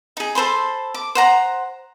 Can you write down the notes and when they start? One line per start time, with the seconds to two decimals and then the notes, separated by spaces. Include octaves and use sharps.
0.17 D#4 G#4
0.35 A4 C5 B5 C6
0.94 D6
1.15 C5 F#5 A#5